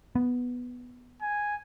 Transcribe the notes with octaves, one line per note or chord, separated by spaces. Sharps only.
B3
G#5